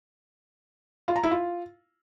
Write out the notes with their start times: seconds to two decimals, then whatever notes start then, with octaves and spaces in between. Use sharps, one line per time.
1.08 F4
1.16 A#5
1.23 E4
1.31 F4